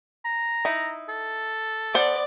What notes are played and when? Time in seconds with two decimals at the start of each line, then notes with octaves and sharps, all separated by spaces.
0.25 A#5
0.65 D#4 E4
1.09 A4
1.94 B3 C5 D5 F#5